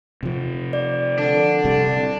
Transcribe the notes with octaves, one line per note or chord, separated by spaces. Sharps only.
C3 F3
D5
D3 D4
C3 G3